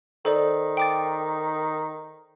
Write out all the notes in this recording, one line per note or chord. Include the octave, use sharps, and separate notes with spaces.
D#3 A4 C5 D5
G5 D6 A6